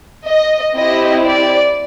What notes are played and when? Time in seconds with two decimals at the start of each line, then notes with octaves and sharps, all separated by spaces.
0.28 D#5
0.77 C4 E4 G4 D#5
1.25 D5